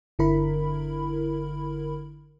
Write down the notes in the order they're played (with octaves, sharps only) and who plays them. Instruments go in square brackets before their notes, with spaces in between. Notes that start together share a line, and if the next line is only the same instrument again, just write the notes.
[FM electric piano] G1 D3 E4 A#4 B5